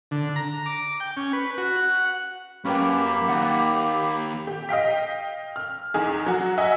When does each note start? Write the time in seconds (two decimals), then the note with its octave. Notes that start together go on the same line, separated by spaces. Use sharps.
0.11 D3
0.36 A#5
0.66 D6
1.00 G5
1.17 C#4
1.33 B4
1.58 F#4
1.76 F#5
2.65 F#2 A#3 C#4 G4 B4 G5 B5
3.28 D#2 F#5
4.47 G4
4.69 D#5 F5 G5 B6
5.56 F6
5.94 E2 D#4 G#4
6.26 F#3 F#4
6.58 D#5 E5 F#5 G#5